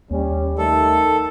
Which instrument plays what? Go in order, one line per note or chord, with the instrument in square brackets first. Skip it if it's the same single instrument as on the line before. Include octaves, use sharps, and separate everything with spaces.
[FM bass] D#2 [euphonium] G3 [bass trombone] C#4
[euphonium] D#3 [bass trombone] A3 [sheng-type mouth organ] A4